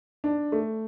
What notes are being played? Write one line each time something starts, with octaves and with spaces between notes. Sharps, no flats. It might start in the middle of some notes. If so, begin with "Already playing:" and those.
D4
A3